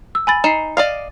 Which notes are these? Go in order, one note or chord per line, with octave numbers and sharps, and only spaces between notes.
E6
G#5 B5 A6
D#4 C7 E7
D5 D#5 F5